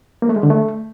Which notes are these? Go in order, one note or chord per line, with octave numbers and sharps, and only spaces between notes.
A#3
A3
G#3
D3
A3